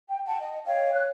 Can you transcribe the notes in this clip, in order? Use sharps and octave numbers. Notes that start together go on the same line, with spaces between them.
G5
F#5 G5 A5
D#5
C#5 D#5 F5 G5
C#5 F#6